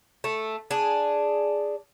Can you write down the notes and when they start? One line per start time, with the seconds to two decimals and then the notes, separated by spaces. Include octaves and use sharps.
0.24 A3
0.71 D4 G#4